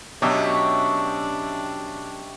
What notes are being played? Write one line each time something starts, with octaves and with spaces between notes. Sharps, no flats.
B2 F#3 C#4 D4 G4 D#5 E5